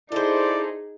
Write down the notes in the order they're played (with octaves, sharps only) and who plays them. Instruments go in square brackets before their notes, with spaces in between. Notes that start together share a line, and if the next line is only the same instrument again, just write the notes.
[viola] D#4 G#4 [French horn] E4 [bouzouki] A4 C5 [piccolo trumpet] D5